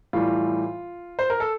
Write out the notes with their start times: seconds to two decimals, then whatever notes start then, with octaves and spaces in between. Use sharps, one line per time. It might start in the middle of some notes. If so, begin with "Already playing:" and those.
0.13 A2 E3 G3 F4
1.19 C5
1.30 A#4
1.40 A4